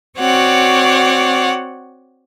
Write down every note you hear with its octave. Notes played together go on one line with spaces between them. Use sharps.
C4 F#4 C#5 D5 F#5